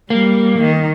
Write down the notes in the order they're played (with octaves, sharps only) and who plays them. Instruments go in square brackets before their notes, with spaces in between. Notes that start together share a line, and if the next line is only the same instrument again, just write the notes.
[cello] G3 [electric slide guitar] A#3
[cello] D#3